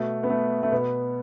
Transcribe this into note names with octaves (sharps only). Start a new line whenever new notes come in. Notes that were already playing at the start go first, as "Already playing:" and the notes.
Already playing: B2 A3
B3
A3
A3
B2 B3